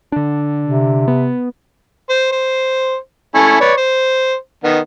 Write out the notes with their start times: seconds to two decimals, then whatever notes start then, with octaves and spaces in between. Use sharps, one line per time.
0.12 D3 D4
0.64 C3
1.08 B3
2.10 C5
2.32 C5
3.35 A3 C#4 E4
3.61 B4 C#5 D5
3.77 C5
4.64 D#3 B3